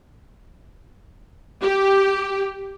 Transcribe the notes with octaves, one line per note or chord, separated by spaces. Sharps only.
G4